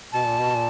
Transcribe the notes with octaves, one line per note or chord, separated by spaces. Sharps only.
B2 A5
A#2
B2
A#2